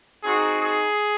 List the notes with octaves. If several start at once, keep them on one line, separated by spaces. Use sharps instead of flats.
C4 D#4 F#4 G#4
G#4